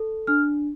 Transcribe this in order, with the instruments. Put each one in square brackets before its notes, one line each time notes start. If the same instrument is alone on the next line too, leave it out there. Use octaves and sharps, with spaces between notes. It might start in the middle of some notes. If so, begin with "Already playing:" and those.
Already playing: [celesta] A4
D4 F6